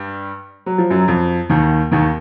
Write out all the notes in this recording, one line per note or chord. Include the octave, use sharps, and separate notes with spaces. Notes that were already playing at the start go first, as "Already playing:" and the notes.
Already playing: G2 G3
F#3
F3
F#2 F#3
F2 F3
D#2 D#3
D#2 D#3